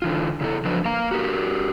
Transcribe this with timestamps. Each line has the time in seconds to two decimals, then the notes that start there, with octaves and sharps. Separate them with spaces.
0.02 D3 E3 F4
0.41 C#3 E4 F#4 A4
0.65 F3 F#3 D4 B4
0.85 A#3 F5 A#5
1.11 F#4 G4 A#4